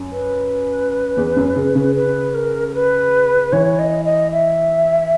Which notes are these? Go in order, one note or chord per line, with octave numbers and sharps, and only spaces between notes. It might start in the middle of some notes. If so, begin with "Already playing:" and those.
Already playing: F#2
B4
E2
F#2
C#3
C#3
B4
A#4
A#4
B4
E3 C#5
D#5
D#5
E5